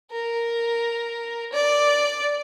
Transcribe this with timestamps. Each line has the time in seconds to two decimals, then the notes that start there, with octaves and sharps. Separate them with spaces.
0.12 A#4
1.53 D5